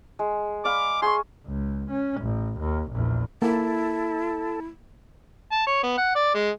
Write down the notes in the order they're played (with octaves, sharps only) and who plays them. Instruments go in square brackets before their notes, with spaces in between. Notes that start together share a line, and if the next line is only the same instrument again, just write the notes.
[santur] G#3
[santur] D5 F5 B5 [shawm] D6
[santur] G#4 C#6 [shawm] C6
[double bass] C#2
C#4
A1
D#2
A#1 E2
[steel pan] A#3 [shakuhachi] E4 [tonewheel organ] A4
[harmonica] A5
C#5
B3
F#5
D5
G#3